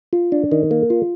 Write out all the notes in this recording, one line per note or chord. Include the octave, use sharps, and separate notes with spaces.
F4
D4
D#3
A#3
F4